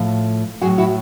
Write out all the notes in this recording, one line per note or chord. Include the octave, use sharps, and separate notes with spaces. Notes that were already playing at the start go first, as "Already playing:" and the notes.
Already playing: A2 F3
A2 F#3 F#4 G#4
E4 F#4